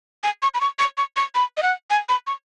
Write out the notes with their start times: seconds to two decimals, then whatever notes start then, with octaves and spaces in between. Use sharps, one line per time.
0.23 G#5
0.42 C#6
0.54 B5
0.61 C#6
0.79 C#6
0.98 C#6
1.17 C#6
1.35 B5
1.57 D#5
1.63 F#5
1.90 G#5
2.09 B5
2.27 C#6